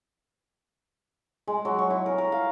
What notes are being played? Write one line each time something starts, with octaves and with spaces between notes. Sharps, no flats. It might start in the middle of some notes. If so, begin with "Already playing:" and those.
G#3
F#3
C#6
E4
A#4
A#4
F5